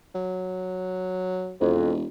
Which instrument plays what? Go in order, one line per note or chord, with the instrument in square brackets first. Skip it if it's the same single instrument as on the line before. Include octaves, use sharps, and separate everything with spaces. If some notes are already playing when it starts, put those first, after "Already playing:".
[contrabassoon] F#3
[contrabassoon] E1 [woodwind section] F2